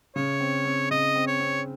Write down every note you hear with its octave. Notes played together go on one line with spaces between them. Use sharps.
C#3 C#5
C4
C4
C#3 D#5
C4
C#5
C4